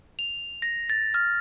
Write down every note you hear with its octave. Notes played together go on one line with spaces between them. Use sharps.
F7
A#6
A6
F6